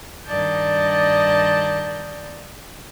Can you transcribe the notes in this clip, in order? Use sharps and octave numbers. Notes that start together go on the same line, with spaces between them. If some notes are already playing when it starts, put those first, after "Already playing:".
G2 D#3 D5 D#5 A5 G6